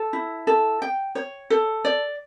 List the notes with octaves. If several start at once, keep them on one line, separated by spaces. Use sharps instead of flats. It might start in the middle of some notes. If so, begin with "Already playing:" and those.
Already playing: A4
E4
A4
G5
C#5
A4
D5